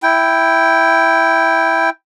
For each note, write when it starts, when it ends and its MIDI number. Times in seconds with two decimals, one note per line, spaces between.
0.03 1.90 64
0.03 1.90 79